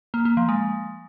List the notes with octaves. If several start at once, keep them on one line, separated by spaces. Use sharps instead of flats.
A#3
A#3
F3
G#3